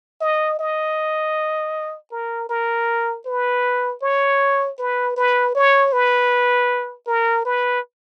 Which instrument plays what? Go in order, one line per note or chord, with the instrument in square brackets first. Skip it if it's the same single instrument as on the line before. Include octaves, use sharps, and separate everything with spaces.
[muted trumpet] D#5
D#5
A#4
A#4
B4
C#5
B4
B4
C#5
B4
A#4
B4